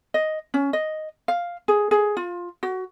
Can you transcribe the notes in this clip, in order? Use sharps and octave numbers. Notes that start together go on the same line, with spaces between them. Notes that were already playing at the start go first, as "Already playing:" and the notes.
D#5
C#4
D#5
F5
G#4
G#4
F4
F#4